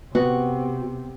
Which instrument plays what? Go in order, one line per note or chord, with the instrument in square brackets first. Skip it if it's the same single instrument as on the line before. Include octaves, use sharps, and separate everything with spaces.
[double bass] C3 [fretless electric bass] B3 [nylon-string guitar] F#4